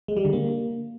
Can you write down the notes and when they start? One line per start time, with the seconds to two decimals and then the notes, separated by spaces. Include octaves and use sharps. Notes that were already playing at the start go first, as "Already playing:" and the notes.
0.08 G#3
0.17 G3
0.25 D3
0.33 A#3